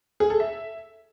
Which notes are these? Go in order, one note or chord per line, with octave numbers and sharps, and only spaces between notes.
G#4
A4
E5